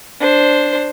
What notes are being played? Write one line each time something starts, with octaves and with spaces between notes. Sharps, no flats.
D4 C5